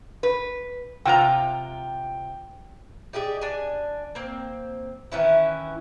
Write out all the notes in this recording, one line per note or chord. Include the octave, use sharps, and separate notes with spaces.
B4
C3 F4 G5 A#5
D#4 G4 G#4 D5
D4 G#5
A#3 C4
D#3 E3 C#4 E4